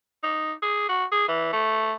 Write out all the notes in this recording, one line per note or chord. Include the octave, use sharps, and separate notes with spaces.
D#4
G#4
F#4
G#4
E3
A3